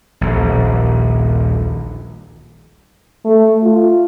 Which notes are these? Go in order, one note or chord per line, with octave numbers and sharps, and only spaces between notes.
D#1 A#1
A3
F4